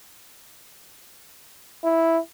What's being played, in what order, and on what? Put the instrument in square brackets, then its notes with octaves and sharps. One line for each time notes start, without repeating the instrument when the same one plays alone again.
[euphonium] E4